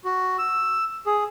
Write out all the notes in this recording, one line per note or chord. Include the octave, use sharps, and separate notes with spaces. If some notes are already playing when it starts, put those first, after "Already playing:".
F#4
E6
G#4